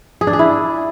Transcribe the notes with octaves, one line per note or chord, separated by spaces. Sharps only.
G#4
D4
G#4
E4